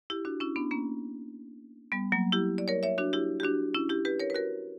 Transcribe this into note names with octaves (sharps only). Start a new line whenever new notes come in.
E4 G4
D4 F#4
C#4 E4
B3 D4
A#3 C#4
G3 B3
F#3 A#3
E4 G4
D5
A#4 C#5
C#5 E5
D4 F#4
E4 G4
G4
D4 F#4
C#4 E4
E4 G4
G4 B4
A#4 C#5
B4
F#4 A#4